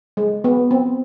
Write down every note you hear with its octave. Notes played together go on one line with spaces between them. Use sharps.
G#3
B3
C4